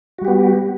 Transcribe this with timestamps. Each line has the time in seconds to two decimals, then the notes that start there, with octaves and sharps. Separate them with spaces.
0.18 F#4
0.21 G3
0.25 G4
0.28 B3